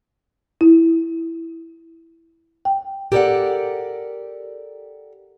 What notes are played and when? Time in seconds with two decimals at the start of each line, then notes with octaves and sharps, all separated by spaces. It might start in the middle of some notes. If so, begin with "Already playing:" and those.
0.61 E4
2.65 G5
3.12 G4 A4 A#4 C#5 D5 F#5